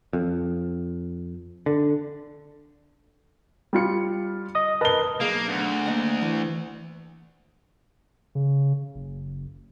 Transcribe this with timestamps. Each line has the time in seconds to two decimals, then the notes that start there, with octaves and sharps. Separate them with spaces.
0.13 F2
1.66 D3
3.73 G3 F4 C#7
4.55 D#5 D#6
4.81 A#4 B4 D#5 A5 G7
5.20 B1 A#3 G#4 F5
5.48 D2
5.86 A#3 D#5 F#5
6.22 E3
8.35 C#3
8.95 F#1